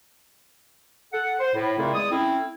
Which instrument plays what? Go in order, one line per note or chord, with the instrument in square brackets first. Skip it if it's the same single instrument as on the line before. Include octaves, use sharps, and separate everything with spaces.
[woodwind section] A4 F#5
C5
A2
A#2 C#3 A3 C4 E4
E2 G#3 D5 D#6
A3 C4 C#4 E4